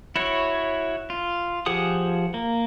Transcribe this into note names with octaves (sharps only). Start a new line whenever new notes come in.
E4 F#4 C#5
F4
F3 G4 G#4 F#5 D#6
A#3